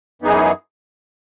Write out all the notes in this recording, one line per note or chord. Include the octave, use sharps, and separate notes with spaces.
F#2 E3 B3 D#4 G#4